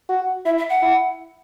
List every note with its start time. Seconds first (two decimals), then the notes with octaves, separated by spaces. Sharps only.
0.09 F#4
0.46 E4 E5
0.58 E5
0.70 F#5
0.82 E4